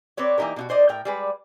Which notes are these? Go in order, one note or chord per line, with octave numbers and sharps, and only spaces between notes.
C4 B4 C#5 D5
E3 A#3 D#4 G4 A#4
B2 D#4 F#4
D4 C5 D5 D#5
A2 A#4 G5
G3 G#3 B4